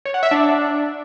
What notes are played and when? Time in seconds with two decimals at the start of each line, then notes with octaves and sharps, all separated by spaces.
0.05 C#5
0.14 F#5
0.23 E5
0.31 D4